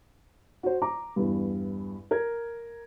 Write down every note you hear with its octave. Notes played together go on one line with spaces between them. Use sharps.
F#4 C5
A#5 D6
E2 G2
A#4 G#6